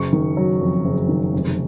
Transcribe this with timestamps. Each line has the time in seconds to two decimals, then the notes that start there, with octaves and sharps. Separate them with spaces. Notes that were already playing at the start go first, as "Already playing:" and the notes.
Already playing: F#1 C#6
0.13 D#3
0.37 F#3
0.61 F2
0.85 F#1
1.08 D#3
1.34 F1